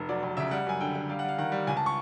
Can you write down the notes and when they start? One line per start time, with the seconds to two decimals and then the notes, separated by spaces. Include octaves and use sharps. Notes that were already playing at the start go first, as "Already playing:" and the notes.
Already playing: F1
0.09 F#3 D5
0.23 F1
0.37 C#3 E5
0.51 G3 F#5
0.66 F#2 G#5
0.81 D3 G5
0.95 D3
1.09 G3 F5
1.19 F#5
1.24 G3 F5
1.38 D#3 F#5
1.52 G3
1.67 C#2 G#5
1.77 A5
1.86 C#6